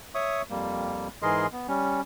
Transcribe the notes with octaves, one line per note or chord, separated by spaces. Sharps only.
C#5 E5 C#6 D#6
F2 G3 A#3
G#2 E3 G#4 A#4 D#5 C6
B3
G3 C#4